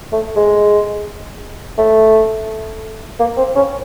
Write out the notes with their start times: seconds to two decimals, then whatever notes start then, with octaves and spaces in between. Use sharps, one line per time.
0.12 A3
0.36 G#3
1.78 A3
3.19 A#3
3.37 C4
3.56 C#4